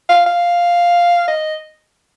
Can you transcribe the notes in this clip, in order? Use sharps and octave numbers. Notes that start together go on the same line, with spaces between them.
F5
F5
D#5